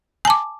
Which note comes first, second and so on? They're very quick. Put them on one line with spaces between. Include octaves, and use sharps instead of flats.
G#5 A5 D6